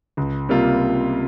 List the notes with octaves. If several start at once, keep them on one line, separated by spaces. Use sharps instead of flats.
C#2
C3 G3 A#3 F4